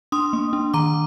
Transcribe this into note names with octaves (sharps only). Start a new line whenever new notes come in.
D4 C6 D#6
A#3
D4
D#3 A#5 D6